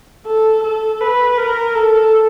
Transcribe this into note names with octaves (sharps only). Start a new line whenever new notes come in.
A4
A4
B4
A#4
A4